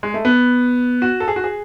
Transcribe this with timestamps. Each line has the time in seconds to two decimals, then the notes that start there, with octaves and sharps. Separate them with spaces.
0.03 G#3
0.14 A3
0.25 B3
1.02 F#4
1.20 A4
1.28 G#4
1.36 F#4
1.44 G#4